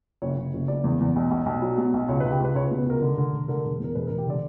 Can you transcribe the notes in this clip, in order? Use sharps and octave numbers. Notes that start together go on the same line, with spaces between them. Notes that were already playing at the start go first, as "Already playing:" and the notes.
F#1 C#5
F#1
F#1
F#1 D5
E2
E2
B1
B1
B1
F#3
B2
B1
C#2 C#5
C#2 B4
G4
C#2 B4
C#2 C#5
B4
B2
B4
C#2 A#4
D3
D3
E1
D3 A#4
E1 A#4
E2 A#4
E1 B4
E1 A#4
G4
D3 D5